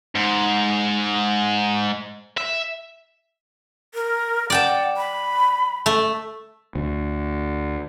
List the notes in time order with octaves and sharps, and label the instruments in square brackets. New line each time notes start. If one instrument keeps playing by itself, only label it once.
[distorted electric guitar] G#2
E5
[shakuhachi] A#4
[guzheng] D5 G5 A5 [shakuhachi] F#5
[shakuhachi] B5
[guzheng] A3
[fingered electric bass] D2